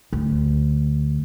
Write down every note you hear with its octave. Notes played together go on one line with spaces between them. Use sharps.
D2